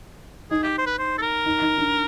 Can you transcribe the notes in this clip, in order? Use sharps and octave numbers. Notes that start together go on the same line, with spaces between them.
D#4 G#4
G4
C5
B4
C5
A4
A#4
D#4
D#4
D4